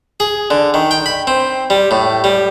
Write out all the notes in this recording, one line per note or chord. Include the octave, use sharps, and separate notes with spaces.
G#4
D3
D#3
G5
B5
C4
G3
A2
G3